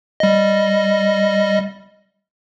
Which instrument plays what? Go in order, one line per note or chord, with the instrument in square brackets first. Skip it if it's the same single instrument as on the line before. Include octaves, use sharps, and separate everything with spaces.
[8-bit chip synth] G3 D#5